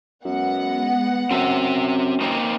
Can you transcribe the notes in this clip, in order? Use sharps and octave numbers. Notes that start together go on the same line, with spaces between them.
F#2 G#3 B3 F#5
F#2 C4 E5
A#3 C4 D#4